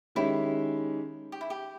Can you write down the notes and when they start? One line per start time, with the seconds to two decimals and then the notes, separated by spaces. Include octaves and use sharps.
0.15 D#3 G#3 C#4 E4 G4
1.32 G4
1.41 E4
1.50 G4